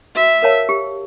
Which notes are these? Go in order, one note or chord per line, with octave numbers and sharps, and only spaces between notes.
F#4 E5
A#4 C#5 F5 A5
G4